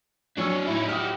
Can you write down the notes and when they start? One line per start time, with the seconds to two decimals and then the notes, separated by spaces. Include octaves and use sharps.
0.38 F#3 D4 C#5 E6
0.68 A2 D#4 E4
0.89 F#4 G4 D#6 F6